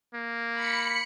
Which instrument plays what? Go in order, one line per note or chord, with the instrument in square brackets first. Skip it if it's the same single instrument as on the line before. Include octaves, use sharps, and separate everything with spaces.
[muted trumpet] A#3
[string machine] B5 C#7